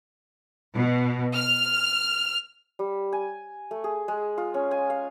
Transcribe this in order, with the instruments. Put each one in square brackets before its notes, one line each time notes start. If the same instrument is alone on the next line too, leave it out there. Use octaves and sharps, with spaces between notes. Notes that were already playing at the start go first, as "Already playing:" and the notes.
[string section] B2
F6
[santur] G3
G#5
A3
G#4
G#3
F4
C#4
G#5
F5